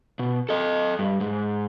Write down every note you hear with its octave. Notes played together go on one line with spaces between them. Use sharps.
B2
A4 D#5
G2
G#2